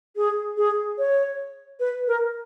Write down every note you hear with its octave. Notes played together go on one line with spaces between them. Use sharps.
G#4
G#4
C#5
B4
A#4